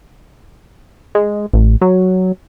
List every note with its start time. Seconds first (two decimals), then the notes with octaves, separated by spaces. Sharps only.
1.15 G#3
1.53 A1
1.81 F#3